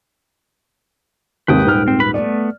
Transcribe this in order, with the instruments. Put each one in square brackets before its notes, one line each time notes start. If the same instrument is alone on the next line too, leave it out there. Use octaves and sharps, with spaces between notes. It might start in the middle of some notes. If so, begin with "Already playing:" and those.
[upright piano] D#2 G#2 C3 [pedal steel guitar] B4 G5 D#6
[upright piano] D#1 G#2 F6
[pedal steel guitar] C4
B4 B5
[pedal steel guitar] A3 B3 [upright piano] D5